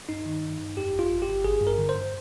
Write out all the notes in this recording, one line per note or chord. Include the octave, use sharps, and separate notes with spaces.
G2 D#4
D#3
G2
G2
F2 G4
G1
F4
G1
G4
G1
G#1 G#4
G2
A#4
D3
C5
G2